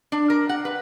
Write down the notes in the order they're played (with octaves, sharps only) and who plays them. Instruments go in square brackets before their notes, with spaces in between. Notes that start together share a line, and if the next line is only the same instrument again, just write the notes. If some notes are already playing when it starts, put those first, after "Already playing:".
[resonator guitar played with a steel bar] D4
A#4
F#5
B4